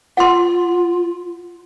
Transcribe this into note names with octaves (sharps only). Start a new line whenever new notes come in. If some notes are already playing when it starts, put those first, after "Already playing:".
F4 F#5 C6